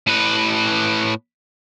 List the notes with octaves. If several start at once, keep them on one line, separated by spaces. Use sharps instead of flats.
A2 B4